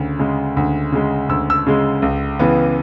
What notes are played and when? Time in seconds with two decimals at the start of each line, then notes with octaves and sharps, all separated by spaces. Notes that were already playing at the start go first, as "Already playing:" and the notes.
Already playing: D2 C#3
0.19 C#3 G#3
0.57 D2
0.92 C#3 G#3
1.29 D2 E6
1.50 E6
1.66 C#3 G#3
2.02 C#2
2.39 C#3 E3 B3